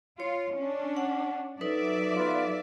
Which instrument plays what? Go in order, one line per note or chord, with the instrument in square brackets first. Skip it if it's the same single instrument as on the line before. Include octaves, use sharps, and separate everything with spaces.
[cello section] F4 [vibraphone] C#5
[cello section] C#4 D4
[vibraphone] F#5
[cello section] F#3 D5 E5 [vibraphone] D#4 A4 B4
[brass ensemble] B3 F4